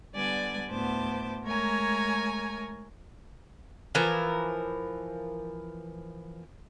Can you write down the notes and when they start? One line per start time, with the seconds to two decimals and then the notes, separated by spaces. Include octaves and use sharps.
0.15 D3 G3 B3 D5 G#5
0.70 D2 A2 B3 C5 A5 D6
1.46 G#3 A3 A#4 C#5 G#5 A#5
3.95 E3 F3 A#4